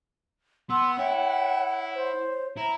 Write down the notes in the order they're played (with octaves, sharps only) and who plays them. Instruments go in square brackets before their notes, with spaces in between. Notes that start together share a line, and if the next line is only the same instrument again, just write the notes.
[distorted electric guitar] B3 [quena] F#5 [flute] C6 [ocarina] E6
[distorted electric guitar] E4 [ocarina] C#5 [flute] G5
[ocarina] C#5
[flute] C5
[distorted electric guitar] E4 [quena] A#5